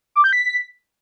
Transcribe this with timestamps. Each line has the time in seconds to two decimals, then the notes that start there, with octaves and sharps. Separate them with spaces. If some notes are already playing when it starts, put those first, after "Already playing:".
0.15 D6
0.24 G6
0.33 B6